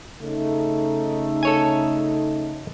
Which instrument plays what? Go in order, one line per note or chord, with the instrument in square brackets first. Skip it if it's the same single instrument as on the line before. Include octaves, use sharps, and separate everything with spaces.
[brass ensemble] C#3 A3 D#4
[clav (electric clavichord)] A4 C#5 G#5